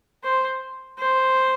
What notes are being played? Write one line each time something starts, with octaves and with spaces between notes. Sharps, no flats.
C5
C5